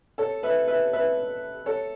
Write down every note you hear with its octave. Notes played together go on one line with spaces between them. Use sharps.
A4 C#5
B4 E5
B4 E5
B4 E5
A4 C#5